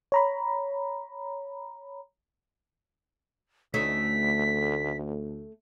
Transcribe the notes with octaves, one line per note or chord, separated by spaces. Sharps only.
C#5 A#5 B5
D2 A3 C#4 D#4 B6